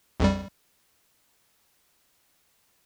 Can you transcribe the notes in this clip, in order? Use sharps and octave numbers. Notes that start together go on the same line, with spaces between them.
A#1 F2 G3